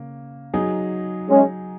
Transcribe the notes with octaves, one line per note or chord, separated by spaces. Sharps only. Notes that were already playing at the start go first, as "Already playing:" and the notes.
Already playing: C#3 A#3
F#3 D#4 G#4
G#3 C#4